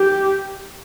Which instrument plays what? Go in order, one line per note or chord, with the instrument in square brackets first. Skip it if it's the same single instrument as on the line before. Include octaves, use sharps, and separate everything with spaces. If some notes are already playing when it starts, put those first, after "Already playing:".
Already playing: [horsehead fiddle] G4